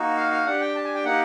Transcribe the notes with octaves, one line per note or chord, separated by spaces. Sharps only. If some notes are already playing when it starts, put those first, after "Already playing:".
Already playing: A#3 D#4 F#4
F5
F5
D4 G4 F#5
G5
A5
G#5
G5
A#3 D#4 G4 F#5